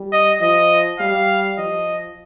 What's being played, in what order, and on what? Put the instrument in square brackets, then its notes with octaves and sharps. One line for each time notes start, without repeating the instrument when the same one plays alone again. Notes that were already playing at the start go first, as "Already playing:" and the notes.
Already playing: [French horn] G3
[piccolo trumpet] D#5
[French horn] F3 [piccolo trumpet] D#5
[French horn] G3 [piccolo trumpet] F5
[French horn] F3 [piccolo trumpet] D#5